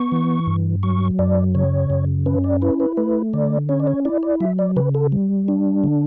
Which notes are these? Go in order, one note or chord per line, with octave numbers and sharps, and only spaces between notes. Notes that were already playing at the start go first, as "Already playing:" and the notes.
Already playing: B3 C#6
E3
G2
F#3 C#6
F#2 D5
C#3 C#5
F#2
C#4 B4
D5
E4 B4
B4
A3 B4
D3 D5
C#4 C#5
D5
C#5
E4 D5
D5
F#3 E5
D5
C#3 B4
A4
G3
D4
D3